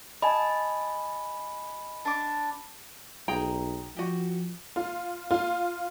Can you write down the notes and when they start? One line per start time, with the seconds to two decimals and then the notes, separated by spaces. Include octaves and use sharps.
0.22 D#5 G#5 A5 B5
2.05 D4 D6
3.28 B1 G#4 G5 A#5
3.97 F3 F#4 G4
4.76 F4
5.31 F4